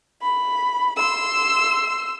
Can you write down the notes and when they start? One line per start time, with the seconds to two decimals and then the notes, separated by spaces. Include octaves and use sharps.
0.22 B5
0.97 C6 E6